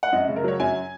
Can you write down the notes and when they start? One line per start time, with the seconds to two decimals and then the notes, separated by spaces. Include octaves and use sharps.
0.03 F#5
0.12 F#2 D#5
0.29 C#3
0.36 A#4
0.44 F#3 C#5
0.60 F#2 G#5